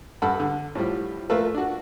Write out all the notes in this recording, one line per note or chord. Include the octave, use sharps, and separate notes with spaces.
G2 A4 F#5 B5
D3
A2 F3 G3
F3 A3 A#3 F4 A4 B4
D4 F#4